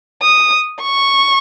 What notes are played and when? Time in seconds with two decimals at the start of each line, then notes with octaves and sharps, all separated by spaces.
0.22 D#6
0.82 C#6